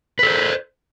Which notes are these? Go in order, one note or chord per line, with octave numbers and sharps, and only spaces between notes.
A4 B4 C5